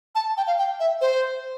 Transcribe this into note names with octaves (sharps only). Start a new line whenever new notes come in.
A5
G5
F5
G5
E5
C5